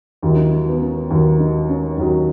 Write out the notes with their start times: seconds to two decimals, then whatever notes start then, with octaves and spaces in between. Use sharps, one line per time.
0.23 D#2 D#3 F#3 D#4
0.30 E4
0.36 D#4
0.52 D#4
0.69 B3
0.81 C#4
1.10 D#2 D#3 F#3
1.40 D#4
1.69 C#4
1.98 D#2 D#3 F#3